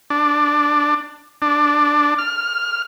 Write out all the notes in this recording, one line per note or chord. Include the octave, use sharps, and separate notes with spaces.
D4
D4
F6